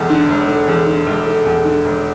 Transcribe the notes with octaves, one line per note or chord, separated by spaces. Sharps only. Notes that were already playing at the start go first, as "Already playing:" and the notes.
Already playing: E1 E2 A3
D3
E1
A3
E2
D3
E1
A3
E2
D3
E1